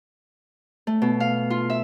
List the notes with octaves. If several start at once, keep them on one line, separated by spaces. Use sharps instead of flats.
A3
B2
F5
F4
E5